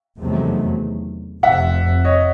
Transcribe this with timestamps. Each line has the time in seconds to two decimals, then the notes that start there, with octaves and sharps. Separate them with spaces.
0.19 E2 C3 D#3 F#3 A3
1.43 F1 F2 C3 E5 F#5
2.05 C#5 D#5